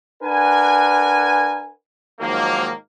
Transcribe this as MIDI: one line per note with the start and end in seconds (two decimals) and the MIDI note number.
0.23 1.70 62
0.23 1.70 70
0.23 1.70 71
0.23 1.70 78
0.23 1.70 80
2.20 2.71 44
2.20 2.71 51
2.20 2.71 53
2.20 2.71 54
2.20 2.71 58